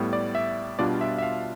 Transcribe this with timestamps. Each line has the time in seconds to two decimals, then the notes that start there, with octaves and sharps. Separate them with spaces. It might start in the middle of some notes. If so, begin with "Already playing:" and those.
Already playing: A2 G3 B3
0.13 D5
0.35 E5
0.79 B2 G3 D4 F4 D5
1.01 E5
1.18 E5
1.22 F5